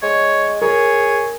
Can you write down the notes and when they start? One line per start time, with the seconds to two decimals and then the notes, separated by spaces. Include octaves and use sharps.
0.02 G#3 C#5
0.62 G#4 A#4 C#5